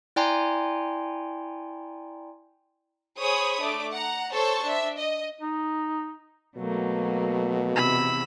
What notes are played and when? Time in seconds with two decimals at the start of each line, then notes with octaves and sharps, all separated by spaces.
0.16 E4 D5 G5 G#5 A#5 C6
3.19 G#4 C5 C#5 B5 C#6 D#6
3.61 A3 D4 D6
3.93 F#5 A#5
4.33 A4 C5 C#5 A5 C#6
4.63 D4 E5
4.99 D#5
5.41 D#4
6.57 B2 F#3 A3 A#3
7.75 E2 C3 B5 E6